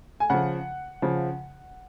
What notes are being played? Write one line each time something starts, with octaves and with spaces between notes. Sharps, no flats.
G#5
C#3 F3 F#5
C#3 F3